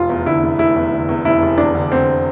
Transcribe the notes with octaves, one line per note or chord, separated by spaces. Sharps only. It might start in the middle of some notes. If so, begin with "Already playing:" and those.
Already playing: F1 F4
E2
D3 E4
F1
F1 E4
E2
D3
E2
F1 E4
F1
E2 D4
D3
D3 C4